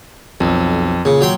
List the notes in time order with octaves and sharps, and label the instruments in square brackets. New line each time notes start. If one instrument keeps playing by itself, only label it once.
[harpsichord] B1 [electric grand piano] F2
[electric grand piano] A#2 [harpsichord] C#3
[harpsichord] F#3 G5 C6